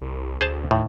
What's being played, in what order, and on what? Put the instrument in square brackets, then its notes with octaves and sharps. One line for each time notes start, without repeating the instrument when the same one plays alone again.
[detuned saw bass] C2
[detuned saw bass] D2 [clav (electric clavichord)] G#4 C5 A5
[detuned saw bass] D#2 [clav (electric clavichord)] A2